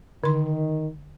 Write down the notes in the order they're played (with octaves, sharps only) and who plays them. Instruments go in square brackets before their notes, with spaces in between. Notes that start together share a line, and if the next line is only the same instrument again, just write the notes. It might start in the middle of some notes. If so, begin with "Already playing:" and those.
[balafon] D3 C6 [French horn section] D#3